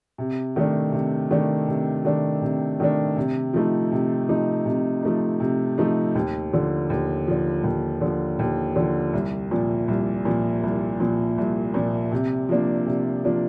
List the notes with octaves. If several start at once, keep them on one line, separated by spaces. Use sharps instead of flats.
C3
D#3 A3 D4
C3
D#3 A3 D4
C3
D#3 A3 D4
C3
D#3 A3 D4
C3
F3 A3 D#4
C3
F3 A3 D#4
C3
F3 A3 D#4
C3
F3 A3 D#4
D#2
D3 F3
D#2
D3 F3
D#2
D3 F3
D#2
D3 F3
C2
A#2 F3
C2
A#2 F3
C2
A#2 F3
C2
A#2 F3
C3
F3 A#3 D4
C3
F3 A#3 D4